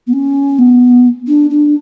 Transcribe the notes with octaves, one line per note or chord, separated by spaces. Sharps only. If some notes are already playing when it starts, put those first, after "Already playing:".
B3
C#4
B3
D4
D4